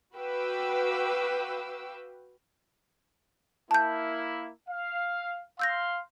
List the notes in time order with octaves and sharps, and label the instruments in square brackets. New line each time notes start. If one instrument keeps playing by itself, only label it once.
[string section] F#4 B4 F5 G5 D6 E6
[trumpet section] A#3 E4 [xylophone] A5 G6
[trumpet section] F5
[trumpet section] F5 C6 [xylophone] E6 G6 A#6